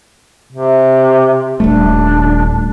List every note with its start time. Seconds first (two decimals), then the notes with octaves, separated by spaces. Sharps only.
0.52 C3
1.60 D#1 G3 A3 D4